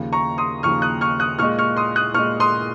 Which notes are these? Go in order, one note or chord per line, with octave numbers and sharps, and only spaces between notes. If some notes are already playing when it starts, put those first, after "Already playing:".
Already playing: D#2 C#3 F3
A#5 C#6
C6 D#6
D#2 C#3 F3 C#6 F6
D#6 F#6
C#6 F6
D#6 F#6
A#2 G#3 C#6 F6
C#6 F6
C6 D#6
D#6 F#6
A#2 G#3 C#6 F6
C6 D#6